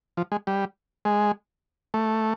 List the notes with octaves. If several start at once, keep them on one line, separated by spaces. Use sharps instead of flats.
F3
G#3
G3
G#3
A3